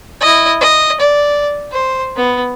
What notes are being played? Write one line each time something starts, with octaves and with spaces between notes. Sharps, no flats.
E4 D#5
D#5
D5
C5
B3